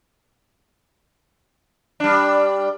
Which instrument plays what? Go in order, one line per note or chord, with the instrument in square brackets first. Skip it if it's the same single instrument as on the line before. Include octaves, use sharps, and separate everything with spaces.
[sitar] G3 D4